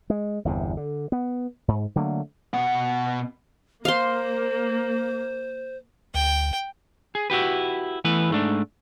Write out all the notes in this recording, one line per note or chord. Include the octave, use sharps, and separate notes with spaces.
G#3
G1 E2 C3
D3
B3
G#2
D3 F#3 A3 A#3
B2 F#5
A#3 C5 F5 C6
D2 G5
G#4
E4 F#4 G4 B4
E3 A3 B3 B4
G#2 A3 D4